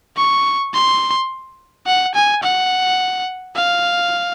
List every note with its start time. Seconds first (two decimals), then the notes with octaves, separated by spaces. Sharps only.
0.17 C#6
0.74 C6
1.87 F#5
2.15 G#5
2.43 F#5
3.56 F5